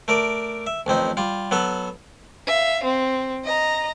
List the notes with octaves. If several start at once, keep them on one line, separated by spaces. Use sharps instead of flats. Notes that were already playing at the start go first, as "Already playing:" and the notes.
A3 A#4 D5
E5
A1 F2 C4 D#4
G3 F4
F#3 B3 A4 B5
E5 F5
C4
D#5 A#5